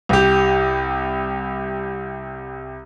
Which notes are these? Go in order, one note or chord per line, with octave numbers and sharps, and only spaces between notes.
C2 G4